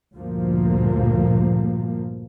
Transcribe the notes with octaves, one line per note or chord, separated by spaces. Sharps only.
D2 G2 A#2 F3 A#3